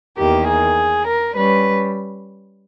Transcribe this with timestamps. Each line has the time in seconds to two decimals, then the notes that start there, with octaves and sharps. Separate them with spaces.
0.17 E2 D#3 A#3 G4
0.47 G#4
1.07 A#4
1.36 G3 C#4 B4